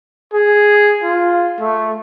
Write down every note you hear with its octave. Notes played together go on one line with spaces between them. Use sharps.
G#4
F4
A3